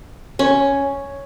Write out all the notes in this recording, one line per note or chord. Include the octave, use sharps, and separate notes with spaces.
C#4